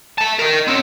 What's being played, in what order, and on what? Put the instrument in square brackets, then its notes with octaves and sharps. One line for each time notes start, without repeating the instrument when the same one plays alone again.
[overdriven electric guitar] E5 A5
A#4 D#5
C4 C#4